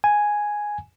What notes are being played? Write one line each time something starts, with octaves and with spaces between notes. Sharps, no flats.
G#5